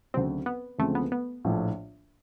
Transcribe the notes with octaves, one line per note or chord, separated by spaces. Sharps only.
D2 C#3 F#3 C4
B3
D2 C#3 F3 G#3 A3 C4
B3
B3
A#1 A2 F3 A3